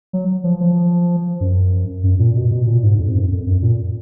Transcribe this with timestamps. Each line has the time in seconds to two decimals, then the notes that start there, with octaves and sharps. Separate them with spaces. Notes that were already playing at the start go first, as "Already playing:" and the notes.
0.13 F#3
0.44 F3
0.61 F3
1.41 F#2
2.04 F#2
2.19 A#2
2.36 B2
2.51 B2
2.67 A#2
2.83 G#2
2.99 F2
3.14 F#2
3.31 F2
3.46 F#2
3.62 A#2